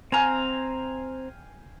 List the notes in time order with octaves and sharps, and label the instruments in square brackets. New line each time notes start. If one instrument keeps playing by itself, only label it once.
[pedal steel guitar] C4 A#5 [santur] F5 G5 G#5